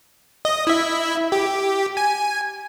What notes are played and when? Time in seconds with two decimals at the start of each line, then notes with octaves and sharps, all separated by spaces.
0.45 D#5
0.67 E4 E5
1.32 G4
1.97 G#5